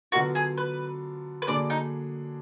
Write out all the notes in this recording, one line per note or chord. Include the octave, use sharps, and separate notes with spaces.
D3 F#3 B3 F4 F#4 A#4
G#4
B4
B4
D3 F#3 A#3 D4 G#4 D5
D#4